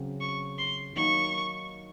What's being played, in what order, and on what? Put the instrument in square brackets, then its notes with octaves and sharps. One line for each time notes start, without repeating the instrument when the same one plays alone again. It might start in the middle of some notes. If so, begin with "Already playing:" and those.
Already playing: [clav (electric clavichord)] C#3 F#3 C4
[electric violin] C#6
C6
[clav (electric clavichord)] D#3 F#3 A#3 D#4 F#4 [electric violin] C#6